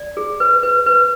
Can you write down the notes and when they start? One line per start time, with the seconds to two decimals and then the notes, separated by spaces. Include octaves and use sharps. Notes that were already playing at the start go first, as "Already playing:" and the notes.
Already playing: D5
0.17 G#4
0.40 B4
0.63 B4
0.86 B4